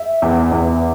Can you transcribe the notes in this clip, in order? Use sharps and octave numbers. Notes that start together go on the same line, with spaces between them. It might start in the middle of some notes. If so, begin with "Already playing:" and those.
Already playing: E5
E2
E2